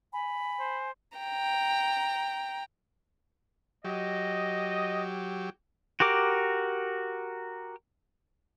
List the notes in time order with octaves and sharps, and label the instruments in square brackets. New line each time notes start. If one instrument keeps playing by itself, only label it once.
[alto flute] G#5 [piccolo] B5
[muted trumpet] C5
[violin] G5 A#5
[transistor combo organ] F#3 G4 [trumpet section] D#5
[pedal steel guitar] F#4 G4 A#4 D6